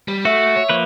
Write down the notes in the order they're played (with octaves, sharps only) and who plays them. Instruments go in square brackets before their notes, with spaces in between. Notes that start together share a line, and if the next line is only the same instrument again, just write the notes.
[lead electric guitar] G3
[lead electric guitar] A3 [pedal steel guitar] F#4 [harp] E5
[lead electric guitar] C#5
[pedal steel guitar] F3 A#3 B4